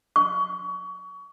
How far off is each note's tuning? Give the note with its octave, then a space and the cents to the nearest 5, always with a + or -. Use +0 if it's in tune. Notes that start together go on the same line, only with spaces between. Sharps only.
C#6 +30